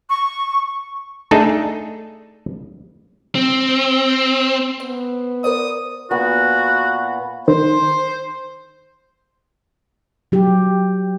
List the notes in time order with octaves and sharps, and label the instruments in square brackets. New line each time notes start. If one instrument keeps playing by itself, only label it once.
[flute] C#6
[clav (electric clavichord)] A3 D4 D#4 G#4 A4
[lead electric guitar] C4
[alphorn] B3 [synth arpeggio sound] C5
[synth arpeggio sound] A#4 C5 D5 [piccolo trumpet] D#6
[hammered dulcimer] A#2 B3 [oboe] F#4
[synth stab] D#3 [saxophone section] C5
[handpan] F#3 G4